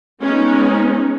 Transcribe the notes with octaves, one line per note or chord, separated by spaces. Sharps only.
G#3 B3 C#4 D#4